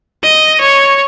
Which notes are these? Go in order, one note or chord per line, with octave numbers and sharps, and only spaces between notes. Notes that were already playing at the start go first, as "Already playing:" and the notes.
D#5
C#5